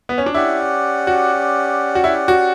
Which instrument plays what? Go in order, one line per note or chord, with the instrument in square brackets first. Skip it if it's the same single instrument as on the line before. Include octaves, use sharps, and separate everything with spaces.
[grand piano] B3
C#4
D4
[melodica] C#4 G4 D5 F#5 [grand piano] E4
[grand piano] F#4
F#4
E4
F#4